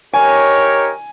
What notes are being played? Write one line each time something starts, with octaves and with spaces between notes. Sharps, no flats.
D#4 G4 A#4 C#5 G#5